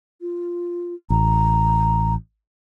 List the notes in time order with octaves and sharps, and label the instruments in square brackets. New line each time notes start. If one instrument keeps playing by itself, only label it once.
[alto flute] F4
[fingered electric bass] A1 [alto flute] A#5